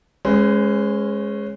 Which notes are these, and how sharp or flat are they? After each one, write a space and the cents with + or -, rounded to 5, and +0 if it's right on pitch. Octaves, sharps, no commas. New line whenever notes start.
G#3 +0 C#4 -15 B4 +40